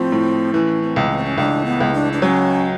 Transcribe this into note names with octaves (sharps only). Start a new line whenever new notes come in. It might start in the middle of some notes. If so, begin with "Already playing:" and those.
Already playing: A2 F3 C4
A2
E3 C#4
C4
C#2
C#4
C4
C#4
C#2 D4
B3
C#2
D4
D4
F#3 C#4